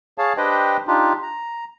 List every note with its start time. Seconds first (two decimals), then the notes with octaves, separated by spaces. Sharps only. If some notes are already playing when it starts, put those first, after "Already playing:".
0.18 G#4 C#5 F5 A5
0.37 D4 G4 B4 C5 D#5 G5
0.87 D4 D#4 F4 G4
1.23 A#5